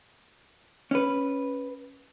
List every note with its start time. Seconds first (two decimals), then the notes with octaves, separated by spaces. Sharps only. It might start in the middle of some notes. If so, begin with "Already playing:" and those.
0.91 C#4 B4